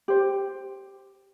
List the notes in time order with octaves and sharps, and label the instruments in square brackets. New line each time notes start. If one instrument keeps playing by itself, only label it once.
[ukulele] G4 C5